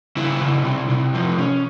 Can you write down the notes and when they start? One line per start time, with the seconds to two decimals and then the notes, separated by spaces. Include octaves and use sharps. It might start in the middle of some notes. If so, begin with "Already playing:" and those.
0.16 C#3 E4
0.41 C#3
0.65 C3
0.89 C3
1.14 F3
1.38 C#4